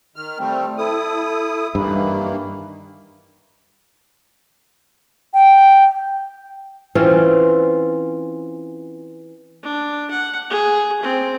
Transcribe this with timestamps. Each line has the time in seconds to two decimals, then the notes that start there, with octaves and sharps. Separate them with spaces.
0.16 D#3 F6
0.39 G3 A3 C4 G5
0.78 E4 A4 D#6
1.75 G2 D#3 E3 A#3 B5
5.34 G5
6.95 E3 C4 C#4 F4
9.63 D4
10.11 F#5
10.50 G#4
11.03 C4